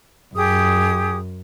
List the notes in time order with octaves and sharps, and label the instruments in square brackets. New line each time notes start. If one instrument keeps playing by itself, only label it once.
[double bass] F#2 [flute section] G4 G#4 D#6